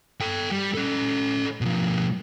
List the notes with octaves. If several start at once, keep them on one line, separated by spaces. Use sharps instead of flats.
A4 G5
G3
C#4 A4
B2 F3